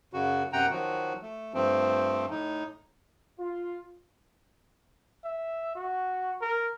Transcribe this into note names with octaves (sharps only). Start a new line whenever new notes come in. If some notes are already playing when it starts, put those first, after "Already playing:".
F#2 C#3 F#4
F#2 C3 F#5 G5 A#5
D#3 F3 F#3 F#4
A3
G2 F3 A3 C4
A2 D#4
F4
E5
F#4
A#4